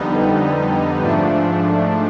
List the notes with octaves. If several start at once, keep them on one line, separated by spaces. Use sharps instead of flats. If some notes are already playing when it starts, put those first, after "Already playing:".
Already playing: F2 D3 G3 B3 D#4
G#2 F3 A3 D4